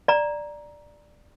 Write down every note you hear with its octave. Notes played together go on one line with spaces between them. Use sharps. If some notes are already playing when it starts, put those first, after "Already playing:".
D5 A#5